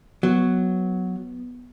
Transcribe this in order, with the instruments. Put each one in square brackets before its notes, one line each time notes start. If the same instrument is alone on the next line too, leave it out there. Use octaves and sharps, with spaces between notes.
[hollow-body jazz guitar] F#3 [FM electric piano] B3